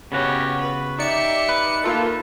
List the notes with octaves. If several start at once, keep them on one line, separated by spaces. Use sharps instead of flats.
C#3 B3 C#4 F#4 G4
B4
D#4 G4 D5 E5 C#7
B4
A#3 D#4 F4 A4 A5